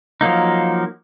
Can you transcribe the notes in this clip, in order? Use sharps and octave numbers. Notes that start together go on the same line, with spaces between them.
F3 F#3 A#3 D#4